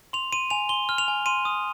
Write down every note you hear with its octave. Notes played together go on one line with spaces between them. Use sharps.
C6 F7
C6 D#7
G#5 F7
C6 G7
F6
F7
G#5
C6 D#7
D#6